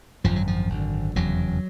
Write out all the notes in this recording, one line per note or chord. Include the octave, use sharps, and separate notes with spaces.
G#1 F#2 D3 F3
F#3
F3
G#1 F#2 D3
F1 E2 C#3 F#3